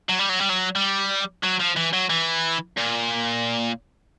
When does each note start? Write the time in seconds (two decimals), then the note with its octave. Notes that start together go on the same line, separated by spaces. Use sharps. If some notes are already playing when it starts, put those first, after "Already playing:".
0.09 F#3
0.19 G3
0.29 F#3
0.40 G3
0.50 F#3
0.76 G3
1.43 F#3
1.60 F3
1.76 E3
1.93 F#3
2.10 E3
2.77 A#2